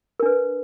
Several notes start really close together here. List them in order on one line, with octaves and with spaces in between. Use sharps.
A#4 D4 B4